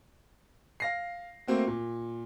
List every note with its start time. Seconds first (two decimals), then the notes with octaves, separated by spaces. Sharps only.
0.80 F5 A#6 C7
1.48 A3 A#3 C4 F#4
1.67 A#2